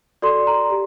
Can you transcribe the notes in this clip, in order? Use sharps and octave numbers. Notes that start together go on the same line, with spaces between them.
F#4 A4 D5 C6
A#5
G4